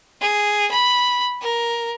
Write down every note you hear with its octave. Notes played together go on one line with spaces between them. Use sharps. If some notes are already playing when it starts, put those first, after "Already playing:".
G#4
B5
A#4